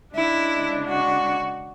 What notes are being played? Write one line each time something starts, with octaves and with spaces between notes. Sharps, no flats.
C#3 G#3 D4 E4
F#4